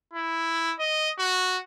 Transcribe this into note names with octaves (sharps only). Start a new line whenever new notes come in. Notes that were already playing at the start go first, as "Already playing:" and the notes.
E4
D#5
F#4